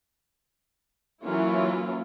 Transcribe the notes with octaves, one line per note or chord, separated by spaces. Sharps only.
E3 F#3 A#3 C#4 E4 F4